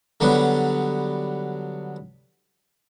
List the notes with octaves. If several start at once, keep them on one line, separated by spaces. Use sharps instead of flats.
D3 F#3 G3 B3